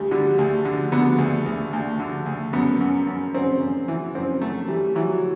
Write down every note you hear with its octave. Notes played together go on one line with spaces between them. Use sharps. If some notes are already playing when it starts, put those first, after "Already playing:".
Already playing: D2 G3
D3 G3
D2
D3
D3 B3
D2
D2
D2
D3
D2
F#2 B3
F#2
F#2
F#2 C4
F#2
E3
F#2 C4
F#2 A3
E3 G3
E3 F#3